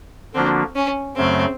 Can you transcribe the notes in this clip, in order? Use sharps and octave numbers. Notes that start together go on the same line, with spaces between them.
D3 F3 A#3 C4 D4 F#4
C#4
F#2 C#3 F#3 A3 C4